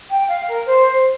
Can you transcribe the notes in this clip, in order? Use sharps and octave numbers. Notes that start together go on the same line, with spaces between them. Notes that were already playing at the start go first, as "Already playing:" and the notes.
G5
F5
A#4
C5